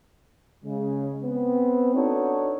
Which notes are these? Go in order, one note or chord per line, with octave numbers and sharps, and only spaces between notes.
C#3 G#3
B3 C4
D4 D#4 F#4 A4 C#5